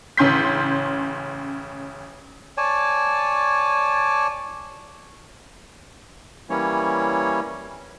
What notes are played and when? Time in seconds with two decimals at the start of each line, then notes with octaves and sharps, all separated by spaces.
0.17 A1 C#3 C#4 C6 G6 B6
2.57 C#5 D5 G#5 A5
6.50 E3 G3 A#3 C#4 E4 C#5